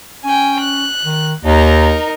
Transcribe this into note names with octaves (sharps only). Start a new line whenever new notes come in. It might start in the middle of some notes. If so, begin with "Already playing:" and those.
C#4 G5 G#5
F#6
D#3
D#2 D#4 A#4